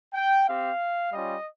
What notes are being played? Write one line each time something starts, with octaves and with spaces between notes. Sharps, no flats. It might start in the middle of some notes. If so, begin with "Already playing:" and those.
G5
C4 G4 F5
G3 C#4 F4 D#5